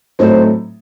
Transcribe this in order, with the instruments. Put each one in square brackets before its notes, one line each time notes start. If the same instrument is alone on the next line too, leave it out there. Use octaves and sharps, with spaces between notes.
[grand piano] A2 F#3 A3 C4 D#4 [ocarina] C5